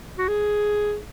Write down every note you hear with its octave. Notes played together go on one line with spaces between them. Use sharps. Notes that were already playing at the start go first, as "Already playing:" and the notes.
F#4
G#4